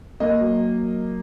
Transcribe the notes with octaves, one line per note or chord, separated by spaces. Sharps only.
A#3 D#5
F#3